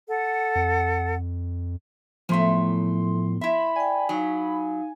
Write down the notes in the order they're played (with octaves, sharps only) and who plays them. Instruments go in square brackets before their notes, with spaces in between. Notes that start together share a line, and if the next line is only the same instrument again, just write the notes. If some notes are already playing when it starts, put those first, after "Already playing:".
[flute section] A4 F#5
[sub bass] F2
[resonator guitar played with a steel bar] F#2 A3 E5 [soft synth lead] A2 [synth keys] F3 C6 [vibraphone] B3
[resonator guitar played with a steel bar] E4 E5 [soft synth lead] B5 [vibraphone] C6
[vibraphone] D5 G5 [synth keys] G#5
[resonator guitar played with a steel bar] F#3 [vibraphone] D#4 F5